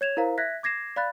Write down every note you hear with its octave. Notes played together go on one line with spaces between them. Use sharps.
C#5 G#6 E7 F7
E4 A#4 C5 F5 A#5
E5 F#6 G#6 A#6 B6
D6 G#6 A#6 C7 E7
D5 F5 B5 F#6 A6